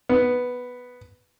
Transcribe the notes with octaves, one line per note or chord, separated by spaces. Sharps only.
B3